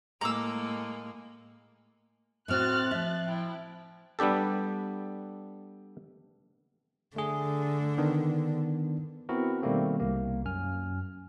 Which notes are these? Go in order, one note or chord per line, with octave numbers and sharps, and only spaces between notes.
A2 G#3 A#3 A#5 D6 E6
A2 C4 F#4 F6 F#6 A6
F3 E5
E4 G5
G3 B3 D4 G4 A4
D3 A3 G#4
D#3 B3 D4
B3 C4 E4 F#4 A#4
B2 D#3 G3 A3 A#3 C4
C2 A#3
F#2 G#5 F6